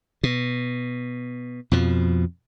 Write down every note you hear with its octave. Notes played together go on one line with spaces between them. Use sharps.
B2
F2 B2 F3